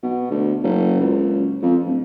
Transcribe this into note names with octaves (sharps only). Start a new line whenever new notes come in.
B2
D2
F#1
C#2
F2
D1